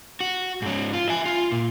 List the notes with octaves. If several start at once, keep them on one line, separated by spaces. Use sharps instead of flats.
F#4
G#2 C#4
F4
E5 G#5
F4
A#2